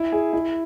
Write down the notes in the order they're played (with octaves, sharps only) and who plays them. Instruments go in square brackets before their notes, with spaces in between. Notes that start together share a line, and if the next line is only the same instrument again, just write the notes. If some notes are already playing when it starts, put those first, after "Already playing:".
Already playing: [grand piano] E4
G#4
E4